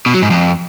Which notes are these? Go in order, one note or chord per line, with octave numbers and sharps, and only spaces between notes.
B2
F#3
G#2
F2